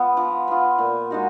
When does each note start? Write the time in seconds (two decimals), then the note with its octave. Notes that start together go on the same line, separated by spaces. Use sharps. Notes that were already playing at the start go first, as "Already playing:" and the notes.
Already playing: B3 F4
0.17 F3
0.48 B3 F4
0.78 A#2
1.11 G#3 D#4 F#4